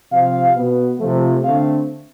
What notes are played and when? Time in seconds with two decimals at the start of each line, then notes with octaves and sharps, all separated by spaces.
0.11 C3 F3 C4 F5
0.56 B2 B3
1.00 C3 F3 A3
1.43 D3 A3 C4 F5